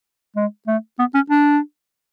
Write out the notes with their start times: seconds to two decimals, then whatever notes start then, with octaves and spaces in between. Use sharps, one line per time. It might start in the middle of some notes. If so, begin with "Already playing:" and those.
0.36 G#3
0.67 A3
0.99 B3
1.14 C#4
1.30 D4